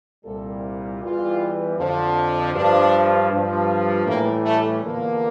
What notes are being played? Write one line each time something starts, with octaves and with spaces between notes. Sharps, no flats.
C2 A#2 G3 A4
E2 E3 G3 F4
F2 D3 F3
G2 F3 D4
G2 F3
A2 E3 G3 A#3
A3
E2 D3 F3 A#3